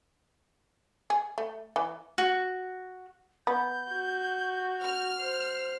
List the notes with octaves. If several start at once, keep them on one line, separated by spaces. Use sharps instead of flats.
G#4
A3
E3
F#4
B3 G6
F#4
F6
C5